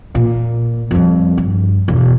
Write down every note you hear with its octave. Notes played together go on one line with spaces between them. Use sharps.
A#2
F2 G3
G2
E1